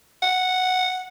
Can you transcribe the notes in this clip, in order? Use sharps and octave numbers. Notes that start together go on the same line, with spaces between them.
F#5